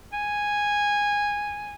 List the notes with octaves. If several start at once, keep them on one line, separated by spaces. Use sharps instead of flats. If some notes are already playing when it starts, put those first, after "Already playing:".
G#5